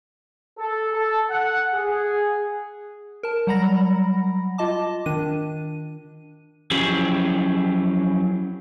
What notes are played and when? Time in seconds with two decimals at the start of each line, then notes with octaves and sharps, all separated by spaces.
0.58 A4
0.92 A4
1.31 F#5
1.74 G#4
3.23 A#4 A5
3.47 F#3 G3 F#5 A#5 B5 A#6
4.58 F4 D#5 A5 D6
5.06 D#3 D4 D#7
6.71 F3 F#3 C#4 E4 G4 G#4